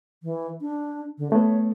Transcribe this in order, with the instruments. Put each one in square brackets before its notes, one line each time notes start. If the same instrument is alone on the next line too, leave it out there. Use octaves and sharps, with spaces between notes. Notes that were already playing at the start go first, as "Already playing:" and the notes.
[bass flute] E3
D4
D3
[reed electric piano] A3 B3 [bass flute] C#5